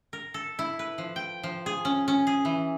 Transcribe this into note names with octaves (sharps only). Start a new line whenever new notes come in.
A#4
A4
E4
B4
F3
G5
F3
G#4
C#4
C#4
G#4
E3